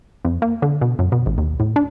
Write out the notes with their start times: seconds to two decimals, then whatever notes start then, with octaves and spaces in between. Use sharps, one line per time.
0.24 F2
0.42 A#3
0.62 D3
0.81 B2
0.99 F#2
1.12 B2
1.26 A1
1.38 D#2
1.60 A2
1.76 D4